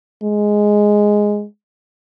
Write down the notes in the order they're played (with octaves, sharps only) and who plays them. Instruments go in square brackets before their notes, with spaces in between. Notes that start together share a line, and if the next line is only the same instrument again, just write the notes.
[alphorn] G#3